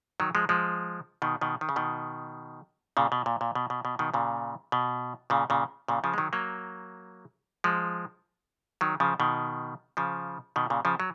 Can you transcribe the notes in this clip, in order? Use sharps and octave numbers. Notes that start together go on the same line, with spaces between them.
D#3 F#3
F3 G#3
F3 G#3
B2 D#3
B2 D#3
D#3
C#3
B2 D#3
A#2 C#3
B2
A#2
A#2
B2
B2
B2
B2 D#3
A#2 C#3
B2
A#2 C#3
A#2 C#3
A#2 C#3
C#3 F3
G#3
D#3 F#3
F#3 A#3
F3 G#3
D#3 F#3
C#3 F3
B2 D#3
C#3 F3
B2 D#3
A#2 C#3
C#3 F3
F#3